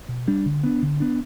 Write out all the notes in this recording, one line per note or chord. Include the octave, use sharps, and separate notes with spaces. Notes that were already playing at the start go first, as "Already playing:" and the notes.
B2
G3 D4
D3
B3 D4
D3
B3 D4